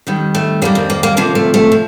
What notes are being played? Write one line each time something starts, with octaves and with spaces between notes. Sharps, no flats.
F2 D#3 G3
A3
F2 D#3 G3 A#3
C4
A#3
A#3
D2 C3 F3 A#3
A3
A3
F3